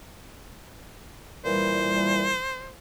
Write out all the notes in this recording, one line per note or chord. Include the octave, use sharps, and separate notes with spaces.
A#2 E3 G3 C5